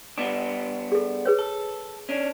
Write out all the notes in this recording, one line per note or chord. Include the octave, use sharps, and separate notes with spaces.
G3 B3 D4 D6
G#4 A4
G#4 B4 C#5
A4
C#4 D4